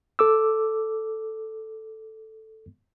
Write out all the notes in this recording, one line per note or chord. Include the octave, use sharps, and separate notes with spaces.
A4 D6 E6